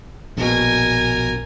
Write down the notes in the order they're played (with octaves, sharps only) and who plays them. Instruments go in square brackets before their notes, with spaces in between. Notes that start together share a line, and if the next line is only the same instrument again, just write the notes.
[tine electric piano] A#1 B2 [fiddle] A#4 G#5